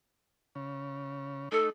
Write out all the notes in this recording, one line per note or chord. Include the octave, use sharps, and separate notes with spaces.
C#3
A3 D#4 A4